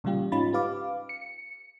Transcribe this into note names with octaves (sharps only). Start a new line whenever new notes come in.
A#2 C#3 E3 G3 F4 G4
G#2 C#4 D#4 F4 B5 A6
G4 B4 F5 D6
C#7